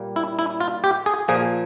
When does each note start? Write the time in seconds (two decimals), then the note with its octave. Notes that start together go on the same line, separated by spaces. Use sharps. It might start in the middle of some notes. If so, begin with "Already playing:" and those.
Already playing: A#2 G3 A#3
0.16 E4
0.39 E4
0.60 F4
0.84 G4
1.06 G#4
1.28 A#2 F3 A#3 G#4